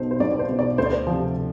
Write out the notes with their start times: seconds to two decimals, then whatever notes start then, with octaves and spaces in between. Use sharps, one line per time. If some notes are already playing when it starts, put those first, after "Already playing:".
Already playing: B1 B2 C5
0.11 C5
0.20 B1 D5
0.32 D5
0.39 C5
0.49 B2
0.59 D5
0.78 D2 C5
0.86 D5
0.93 C5
1.07 C3 F3